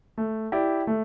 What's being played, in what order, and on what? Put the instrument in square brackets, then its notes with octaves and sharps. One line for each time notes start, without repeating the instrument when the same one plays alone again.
[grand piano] A3
E4 G4 D5
A3